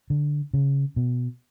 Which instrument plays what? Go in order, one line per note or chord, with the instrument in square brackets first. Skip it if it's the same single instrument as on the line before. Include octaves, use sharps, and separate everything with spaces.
[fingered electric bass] D3
C#3
B2